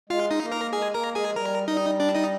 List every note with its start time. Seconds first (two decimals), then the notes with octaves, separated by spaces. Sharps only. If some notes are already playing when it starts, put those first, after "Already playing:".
0.10 G#3 F4 F5
0.30 D#4 D#5
0.42 A#3
0.52 A#4 A#5
0.73 G#3 G#4 G#5
0.94 A#3 A#4 A#5
1.15 G#3 G#4 G#5
1.31 F3
1.36 G3 A#4 A#5
1.68 G3 D#4 D#5
2.00 D4 D5
2.15 D#4 D#5